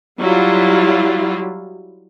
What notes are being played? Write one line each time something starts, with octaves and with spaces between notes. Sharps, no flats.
F#3 G3 E4 F4